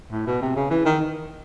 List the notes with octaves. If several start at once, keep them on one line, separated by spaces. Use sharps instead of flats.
A2
B2
C3
C#3
E3
D#3